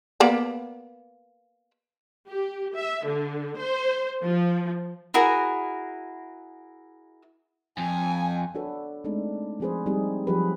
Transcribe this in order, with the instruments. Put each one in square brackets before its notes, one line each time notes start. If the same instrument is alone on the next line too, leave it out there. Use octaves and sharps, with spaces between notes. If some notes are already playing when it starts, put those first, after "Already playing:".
[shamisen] A#3 B3 D5
[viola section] G4
E5
D3
C5
F3
[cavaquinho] E4 F#4 G#4 A#4
[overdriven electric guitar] F2 [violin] G#5
[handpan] D4 F#4 A4 B4 C#5
G#3 A3 C4 D4 D#4
F3 C4 G#4 B4 C5
G3 C4 D#4 G#4
F3 F#3 G4 G#4 B4